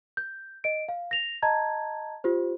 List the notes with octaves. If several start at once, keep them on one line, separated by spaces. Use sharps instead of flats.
G6
D#5 D7
F5
A#6 F7
D#5 A5 A#5 G#6
F4 G4 C5